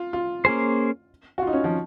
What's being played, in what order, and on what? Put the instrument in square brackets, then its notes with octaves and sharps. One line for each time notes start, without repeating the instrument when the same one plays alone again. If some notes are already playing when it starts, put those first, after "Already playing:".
Already playing: [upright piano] F4
F4
[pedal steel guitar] A#3 C#4 G#4 C5
[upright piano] F#4
F4
D#4
C#4
F3